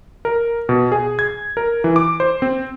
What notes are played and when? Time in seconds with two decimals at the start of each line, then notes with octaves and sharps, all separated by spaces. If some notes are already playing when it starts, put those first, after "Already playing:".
0.25 A#4
0.69 B2
0.92 G#4
1.19 G#6
1.57 A#4
1.84 E3
1.96 D6
2.20 C5
2.42 C4